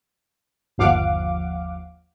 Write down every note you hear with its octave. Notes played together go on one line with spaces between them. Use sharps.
G1 D#2 F3 F5 F#5 D6